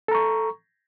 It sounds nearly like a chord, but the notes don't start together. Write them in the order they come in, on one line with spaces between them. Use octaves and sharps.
A4 A#5 C#6